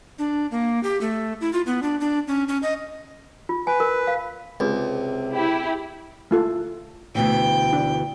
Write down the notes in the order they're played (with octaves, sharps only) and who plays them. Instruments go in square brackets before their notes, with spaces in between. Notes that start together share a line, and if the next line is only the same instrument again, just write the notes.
[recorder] D4
A#3
G4
A3
E4
F4
B3
D4
D4
C#4
C#4
D#5
[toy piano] F4
[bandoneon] B4 [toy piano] G#5
[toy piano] A#4
F5
[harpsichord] C#2 [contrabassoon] C3
[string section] E4 G4
[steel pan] A3 F4 A4
[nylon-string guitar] D2 B2 E3 [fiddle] G5
[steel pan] D4